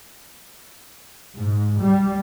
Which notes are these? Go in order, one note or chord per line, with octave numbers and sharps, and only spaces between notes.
G#2
G3